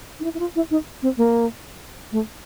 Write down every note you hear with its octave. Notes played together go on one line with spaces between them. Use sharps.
D#4
E4
E4
F4
E4
D#4
C4
A#3
A3